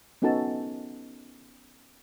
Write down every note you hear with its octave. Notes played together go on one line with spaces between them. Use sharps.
B3 C#4 D#4 F#4 A4 A5